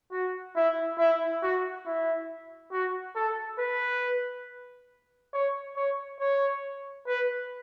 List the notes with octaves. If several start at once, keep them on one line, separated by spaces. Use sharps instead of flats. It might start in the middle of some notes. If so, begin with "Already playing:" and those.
F#4
E4
E4
F#4
E4
F#4
A4
B4
C#5
C#5
C#5
B4